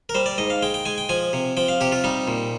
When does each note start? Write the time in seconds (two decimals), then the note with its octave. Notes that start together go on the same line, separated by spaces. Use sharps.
0.09 A#4
0.15 G3 C5
0.26 D5
0.38 G#2 D#5
0.50 F5
0.62 G#3 G5
0.74 G5
0.85 G#3 G#5
0.98 G5
1.09 F3 G#5
1.33 C3
1.57 F3 G5
1.68 F5
1.81 C3 G4
1.92 F4
2.04 G3 D#4
2.28 A#2